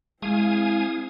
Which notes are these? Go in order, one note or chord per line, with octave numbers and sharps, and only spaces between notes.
G#3 C4 E4 F5 G#5 D#6